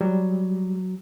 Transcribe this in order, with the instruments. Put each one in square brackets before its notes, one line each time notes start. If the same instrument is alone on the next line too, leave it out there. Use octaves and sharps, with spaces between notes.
[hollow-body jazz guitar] F#3 [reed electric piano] G3